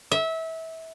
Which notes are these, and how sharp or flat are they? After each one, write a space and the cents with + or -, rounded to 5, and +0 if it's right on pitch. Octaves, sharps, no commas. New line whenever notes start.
E5 -25